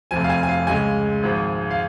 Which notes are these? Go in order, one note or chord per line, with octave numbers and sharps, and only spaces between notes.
F1 F2 F3 G#5
F5
G#5
G#5
F5
C#2 C#3 G#3 G#5
G#1 G#2 F3
F5